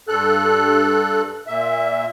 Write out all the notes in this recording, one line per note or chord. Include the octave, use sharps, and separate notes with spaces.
G2 A4 F#6
A#2 E5